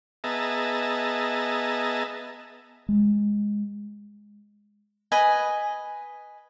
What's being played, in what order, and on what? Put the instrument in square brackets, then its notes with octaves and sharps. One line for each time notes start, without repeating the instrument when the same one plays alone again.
[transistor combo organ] B3 G#4 D#5 E5 A5 A#5
[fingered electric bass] G#3
[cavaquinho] B4 D#5 G#5